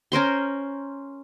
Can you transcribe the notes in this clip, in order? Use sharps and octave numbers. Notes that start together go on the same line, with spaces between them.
C#4 A#4 C5 C6